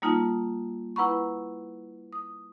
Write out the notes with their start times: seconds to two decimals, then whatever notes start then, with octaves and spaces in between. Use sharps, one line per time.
0.02 G3 A#3 D#4 F4 A5
0.96 E4 B4 F#5 A#5 B5 C#6
2.13 D#6